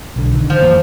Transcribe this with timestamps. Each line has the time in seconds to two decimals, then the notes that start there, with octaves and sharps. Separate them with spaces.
0.16 B1 D3
0.32 D3 D#3
0.50 F3
0.63 F#2 E3 A#3